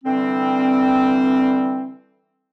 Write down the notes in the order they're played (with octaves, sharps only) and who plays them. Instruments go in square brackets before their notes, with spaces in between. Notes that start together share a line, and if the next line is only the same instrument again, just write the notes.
[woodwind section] D3 E3 G3 C4